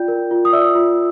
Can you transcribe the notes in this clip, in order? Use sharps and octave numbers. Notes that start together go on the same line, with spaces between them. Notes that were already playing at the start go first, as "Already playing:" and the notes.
Already playing: F4 D5 G5 G6
A#4
F4
D#6
D5 E5 E6
F4